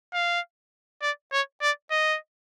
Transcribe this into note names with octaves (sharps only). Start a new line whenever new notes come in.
F5
D5
C#5
D5
D#5